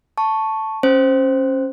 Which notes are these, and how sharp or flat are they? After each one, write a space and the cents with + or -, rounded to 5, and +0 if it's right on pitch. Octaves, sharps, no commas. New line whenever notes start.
A5 +0 C#6 +0
C#4 -25 C5 +0